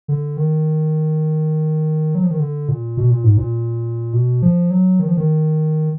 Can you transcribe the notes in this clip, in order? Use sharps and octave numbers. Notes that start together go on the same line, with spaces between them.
D3
D#3
F#3
F3
D#3
D3
A#2
B2
A#2
G#2
A#2
B2
F3
F#3
D#3
F3
D#3